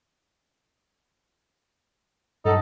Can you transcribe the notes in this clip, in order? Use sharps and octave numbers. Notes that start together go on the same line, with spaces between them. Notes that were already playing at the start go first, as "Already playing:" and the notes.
G2 F#3 D#4 A4